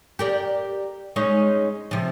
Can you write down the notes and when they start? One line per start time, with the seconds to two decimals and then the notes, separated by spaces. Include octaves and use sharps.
0.19 G4 A#4 D5
1.16 G#3 C#4 D#4
1.91 C3 F3